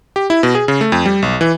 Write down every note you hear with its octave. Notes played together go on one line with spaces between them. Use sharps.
G4
E4
B2
G#4
C#3
A3
F2
G3
B1
E3